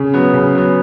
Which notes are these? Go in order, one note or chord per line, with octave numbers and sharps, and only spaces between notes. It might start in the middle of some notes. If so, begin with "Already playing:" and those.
Already playing: C#3
F#3 B3
C#3
F#3 B3